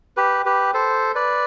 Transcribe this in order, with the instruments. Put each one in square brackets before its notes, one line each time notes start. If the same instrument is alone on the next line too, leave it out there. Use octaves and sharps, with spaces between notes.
[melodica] G4 B4
G4 B4
A4 C5
B4 D5